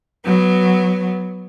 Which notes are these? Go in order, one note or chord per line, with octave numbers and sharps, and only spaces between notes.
F#3 B3